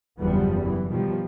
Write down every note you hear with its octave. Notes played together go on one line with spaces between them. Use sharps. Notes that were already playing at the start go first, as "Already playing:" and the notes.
F#1 E2 G2 F3 G3 B3
F#2 E3
B2 D#3 F3 G3